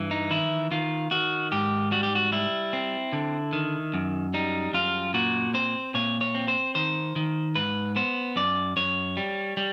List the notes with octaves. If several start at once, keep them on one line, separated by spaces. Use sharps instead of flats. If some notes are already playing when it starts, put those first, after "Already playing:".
Already playing: G2 E3
D#4
D#3 E4
D#3 F4
D#3 F#4
G#2 G4
G3 F#4
G4
F#4
G3 E4
C4
D3
D#3
F#2
G3 D#4
F#2 F4
A#2 F#4
C4 C5
A#2 C#5
C#5
C4
C5
D#3 C5
D#3
G#2 B4
B3 C5
F#2 D5
F#2 C#5
G3
G3